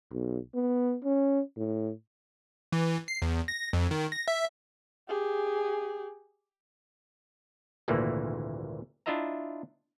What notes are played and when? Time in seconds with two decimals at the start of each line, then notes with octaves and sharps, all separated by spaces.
0.12 B1
0.55 B3
1.04 C#4
1.57 A2
2.72 E3
3.08 C7
3.22 E2
3.48 A#6
3.73 F2
3.91 D#3
4.12 A#6
4.28 E5
5.09 G4 G#4
7.88 G#1 D2 A#2 D3 E3 A#3
9.06 D4 E4 F4 D#5 E5 A#5